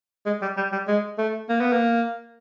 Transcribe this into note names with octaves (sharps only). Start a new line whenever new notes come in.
G#3
G3
G3
G3
G#3
A3
A#3
B3
A#3